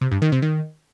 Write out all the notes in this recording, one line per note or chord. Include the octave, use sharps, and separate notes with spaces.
C3
G2
D#3
C3
D#3